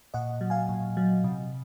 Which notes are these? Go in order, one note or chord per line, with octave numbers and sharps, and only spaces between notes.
A#2 D#5 F#5
F#3
F5 G#5
A#2
F#3
C3